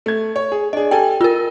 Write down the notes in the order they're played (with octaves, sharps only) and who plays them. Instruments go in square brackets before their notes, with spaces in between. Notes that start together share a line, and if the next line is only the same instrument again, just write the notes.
[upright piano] A3 G#6
C#5
G#4
[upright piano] D4 G#4 [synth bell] D#5
[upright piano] G4 A4 G#5 [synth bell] G5
[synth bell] F4 A#4 [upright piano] E6